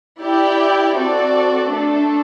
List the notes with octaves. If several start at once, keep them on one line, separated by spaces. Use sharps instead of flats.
E4 G4 D5 G5
C4 F#4 A4 D5
A3 D4 A4